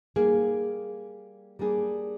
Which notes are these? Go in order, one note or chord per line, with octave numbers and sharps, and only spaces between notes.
G3 A#3 D#4 G#4
G3 A#3 D4 G#4